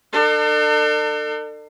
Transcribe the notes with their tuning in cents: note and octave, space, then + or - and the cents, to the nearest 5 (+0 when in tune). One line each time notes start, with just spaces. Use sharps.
D4 +45 A4 +40